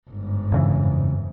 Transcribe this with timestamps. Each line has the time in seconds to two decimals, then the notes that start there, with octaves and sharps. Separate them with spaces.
0.10 G1 G#2
0.52 F2 C#3 E3